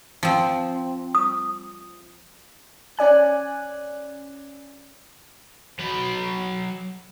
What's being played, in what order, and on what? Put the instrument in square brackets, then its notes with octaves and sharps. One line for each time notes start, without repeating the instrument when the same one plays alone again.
[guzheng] F3 C4
[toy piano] D#6
[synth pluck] C#4 D5 G#5 F#6
[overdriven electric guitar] F#3 B5